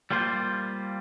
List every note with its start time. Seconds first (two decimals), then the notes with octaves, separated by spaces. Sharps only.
0.11 G3 A#3 F4 C5